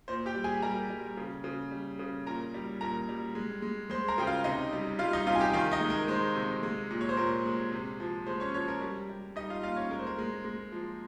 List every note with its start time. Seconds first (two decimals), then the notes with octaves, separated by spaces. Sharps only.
0.08 A#2 C5
0.26 G4 G5
0.35 G3
0.44 G#4 G#5
0.62 G3 A#4 A#5
0.90 G3
1.17 C#3
1.44 C#3
1.71 G3
1.99 C#3
2.26 A#2 A#4 A#5
2.54 G3
2.81 A#2 A#4 A#5
3.09 G3
3.35 G#3
3.62 G#3
3.90 G#3 C5 C6
4.08 A#4 A#5
4.18 C#3 G5
4.27 F4 F5
4.44 C3 D#4 D#5
4.73 G3
4.99 G3 F4 F5
5.13 D#4 D#5
5.26 C3 F4 F5
5.35 G#5
5.40 G4 G5
5.53 D#3 F4 F5
5.72 D#4 D#5
5.81 G#3
5.90 A#4
6.08 G#3 C5
6.35 C3
6.63 G#3
6.91 A#2
7.01 C#5
7.09 C5
7.17 A#2 A#4
7.46 G#3
7.72 C3
8.00 F3
8.26 G#3 C5
8.40 C#4 C#5
8.54 F3 C#4 C#5
8.68 A#4
8.81 G3
9.09 G3
9.36 G3 D#4 D#5
9.50 F4 F5
9.63 A#2 F4 F5
9.76 C#4 C#5
9.91 G#3 A#4
9.99 C5
10.07 A#4
10.19 G#3
10.45 G#3
10.72 F3